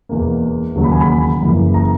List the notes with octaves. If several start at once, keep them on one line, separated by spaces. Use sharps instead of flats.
E1 E2 B2 A#3
E1 D#2 C#3 F#3 A#3
B5
G#5
B5
F#1 F#2 E3 A#3
A#5